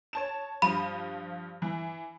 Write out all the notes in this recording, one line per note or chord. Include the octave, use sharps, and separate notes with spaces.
C#5 A5 E7
G2 F3 B5 D#7
E3